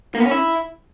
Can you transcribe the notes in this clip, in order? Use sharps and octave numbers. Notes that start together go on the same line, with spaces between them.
A#3
B3
C#4
E4